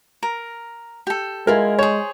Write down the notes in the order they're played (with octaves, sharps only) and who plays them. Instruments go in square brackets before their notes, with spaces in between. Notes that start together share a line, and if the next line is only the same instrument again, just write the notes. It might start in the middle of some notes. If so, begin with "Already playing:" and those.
[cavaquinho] A#4
G4 A4
[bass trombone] G#3 [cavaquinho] E4 F4 G#5 [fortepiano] A#4
[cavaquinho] G#4 C5 [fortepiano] C#5